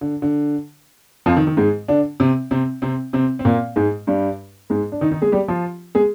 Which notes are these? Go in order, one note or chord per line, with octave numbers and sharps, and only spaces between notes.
D3
D3
F2 F3
D#3
D#3
G#2 G#3
D3 D4
C3 C4
C3 C4
C3 C4
C3 C4
C4
A#2 A#3
G#2 G#3
G2 G3
G#2 G#3
D4
D#3 D#4
D#3 D#4
G#3 G#4
G3 G4
F3 F4
G#3 G#4